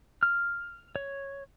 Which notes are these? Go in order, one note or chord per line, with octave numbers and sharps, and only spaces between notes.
F6
C#5